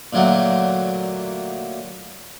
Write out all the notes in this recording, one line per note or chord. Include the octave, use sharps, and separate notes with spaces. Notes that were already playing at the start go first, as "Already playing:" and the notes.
A#2 D3 F#3 A3 F#5